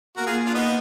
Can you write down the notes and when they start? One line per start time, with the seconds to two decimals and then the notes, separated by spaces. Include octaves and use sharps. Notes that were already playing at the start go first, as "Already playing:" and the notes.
0.17 A#3 F#4 A#4
0.26 F4 G#4
0.46 D4 F4
0.55 B3 D#4